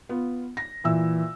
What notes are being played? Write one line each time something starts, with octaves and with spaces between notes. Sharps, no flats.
B3 F4
A#6
A#2 E3 E5 E6